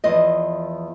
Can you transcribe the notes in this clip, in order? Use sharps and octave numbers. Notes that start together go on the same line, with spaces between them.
E2 F3 D#5